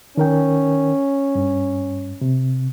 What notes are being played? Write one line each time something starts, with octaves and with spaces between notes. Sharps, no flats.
D#3 C#4 A#4 G5
G2
C3